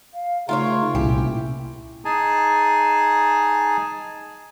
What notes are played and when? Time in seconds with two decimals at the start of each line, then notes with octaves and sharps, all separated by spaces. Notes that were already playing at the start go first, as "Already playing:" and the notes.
0.14 F5
0.49 C#3 A3 D#4 F4 A#4 C#5 C6
0.95 C2 A#2 C#4 E4 G4
2.05 D#4 G#4 G#5 A5